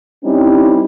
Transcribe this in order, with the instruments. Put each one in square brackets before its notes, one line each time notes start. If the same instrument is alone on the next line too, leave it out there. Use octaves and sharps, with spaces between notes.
[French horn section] G3 C4 C#4 D#4 E4